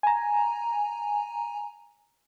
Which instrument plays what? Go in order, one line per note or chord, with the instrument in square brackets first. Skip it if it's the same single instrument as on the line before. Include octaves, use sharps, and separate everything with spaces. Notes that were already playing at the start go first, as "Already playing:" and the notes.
[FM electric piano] G#5 A#5